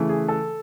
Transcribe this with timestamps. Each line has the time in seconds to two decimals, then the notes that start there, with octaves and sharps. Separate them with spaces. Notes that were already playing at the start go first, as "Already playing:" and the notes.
Already playing: C#3 E3 A3
0.09 G#4
0.28 A4